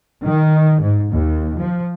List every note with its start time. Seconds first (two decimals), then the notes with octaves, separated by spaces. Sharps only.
0.25 D#3
0.81 G#2
1.12 D#2
1.58 F3